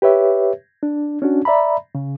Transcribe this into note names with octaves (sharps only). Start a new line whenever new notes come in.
G4 B4 C#5 E5
D4
C#4 D4 F#4
D5 E5 A#5 B5
C#3